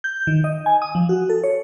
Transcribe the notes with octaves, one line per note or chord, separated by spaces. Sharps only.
G6
D#3
D#5
G#5
D#6
F3
F#4
A4
C#5